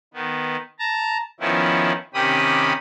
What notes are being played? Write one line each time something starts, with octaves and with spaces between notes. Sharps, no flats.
D#3 B3
A5 A#5
D#3 F3 B3 C#4 E4
C3 D#3 C#4 G4 B5 D#6